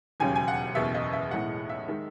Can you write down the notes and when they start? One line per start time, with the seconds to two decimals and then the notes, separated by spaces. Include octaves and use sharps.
0.20 E1 D#2 C#3 F#3 G#5
0.36 G#5
0.48 F#5
0.75 F#1 E2 B2 E5
0.94 D#5
1.13 E5
1.31 B1 A2 E3 G#3 F#5
1.69 E5
1.88 D#3 G#3